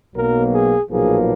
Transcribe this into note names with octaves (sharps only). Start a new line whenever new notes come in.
B1 B2 F#3 A#3 A#4
G#4
B1 A#2 F3 A#3 G#4